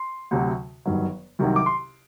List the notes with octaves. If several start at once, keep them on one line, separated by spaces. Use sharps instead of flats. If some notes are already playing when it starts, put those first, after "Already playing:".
Already playing: C6
D2 C3 F#3
G1 G2 D#3 F#3
C2 C3 D#3 F#3
D6
C6